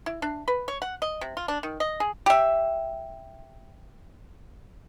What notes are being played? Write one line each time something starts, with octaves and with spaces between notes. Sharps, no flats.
E4
D4
B4
C#5
F#5
D#5
C3
F4
D4
D#3
D#5
G#4
G4 E5